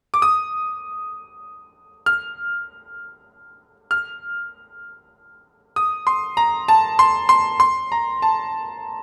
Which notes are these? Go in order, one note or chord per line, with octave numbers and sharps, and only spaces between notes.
D6
D#6
F6
F6
D#6
C6
A#5
A5
C6
C6
C6
A#5
A5